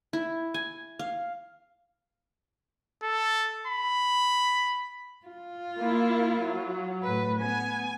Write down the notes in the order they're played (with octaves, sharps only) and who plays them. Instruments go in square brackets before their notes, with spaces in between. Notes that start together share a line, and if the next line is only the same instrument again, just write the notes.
[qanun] E4
G#5
F5
[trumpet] A4
B5
[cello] F4
[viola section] A#3 E4
F#3
[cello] A2 B4
[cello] B3 [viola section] G#5